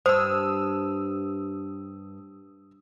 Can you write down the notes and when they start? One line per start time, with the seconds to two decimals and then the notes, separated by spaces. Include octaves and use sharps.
0.06 G2 C5 D#6 E6